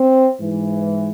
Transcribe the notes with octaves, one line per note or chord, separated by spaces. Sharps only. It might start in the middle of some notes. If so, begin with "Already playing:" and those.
Already playing: C4
G#2 E3